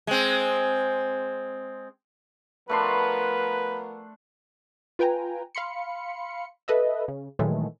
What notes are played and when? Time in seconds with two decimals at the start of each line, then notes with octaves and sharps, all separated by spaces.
0.07 G#3 C4
2.69 F3 A3 B3 D4 A#4 B4 C6
4.99 F4 B4 G5 G#5 A#5
5.55 F5 B5 C6 C#7
6.68 A4 B4 D#5 E5
7.08 C#3
7.39 A#2 D#3 E3 F#3 G#3 A3